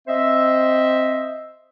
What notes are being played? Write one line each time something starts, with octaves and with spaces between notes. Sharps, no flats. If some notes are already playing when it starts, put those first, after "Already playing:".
C4 C5 D#5 E5